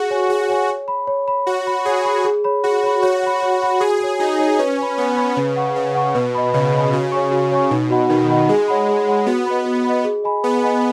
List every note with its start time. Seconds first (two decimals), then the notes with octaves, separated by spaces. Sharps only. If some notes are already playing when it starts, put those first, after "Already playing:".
Already playing: F#4 G#4
0.10 C#5 G#5 C#6
0.29 F#4 G#4
0.49 C#5 G#5 C#6
0.69 C#5
0.88 B5
1.07 C#5
1.28 B5
1.47 F#4 C#5
1.67 B5
1.85 G#4 C#5
2.05 B5
2.24 G#4
2.44 C#5 B5
2.64 F#4 G#4
2.83 C#5 B5
3.02 F#4 C#5
3.23 F#5 B5
3.42 C#5
3.62 F#5 B5
3.80 F#4 G#4
4.00 C#5 G#5
4.19 D#4 F#4
4.39 C#5 G#5
4.58 C#4 B4
4.78 G#5 B5
4.98 B3 B4
5.17 G#5 B5
5.37 C#3 B4
5.56 F#5 C#6
5.76 C#3 B4
5.95 F#5 C#6
6.15 B2 B4
6.35 D#5 B5
6.54 C#3 B4
6.74 D#5 B5
6.93 C#3 F#4
7.12 C#5 G#5 C#6
7.31 F#4
7.51 C#5 G#5 C#6
7.71 B2 D#4
7.90 F#4 D#5 F#5 B5
8.09 D#3 D#4
8.29 F#4 D#5 F#5 B5
8.49 G#3 G#4
8.68 C#5 F#5 B5
8.88 G#4
9.08 C#5 F#5 B5
9.26 B3 F#4
9.46 D#5 B5
9.65 F#4
9.85 D#5 B5
10.04 G#4
10.24 D#5 G#5 B5
10.43 B3 G#4
10.63 D#5 G#5 B5